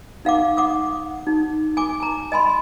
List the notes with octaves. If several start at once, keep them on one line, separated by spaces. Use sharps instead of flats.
D#4 F5 F#5 D6
F#5 D6 D#6
D#4
G#5 D6
A5 A#5
D#5 G#5 B5 C6